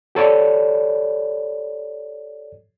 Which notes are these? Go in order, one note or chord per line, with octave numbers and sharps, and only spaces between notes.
G4 A4 C#5 D5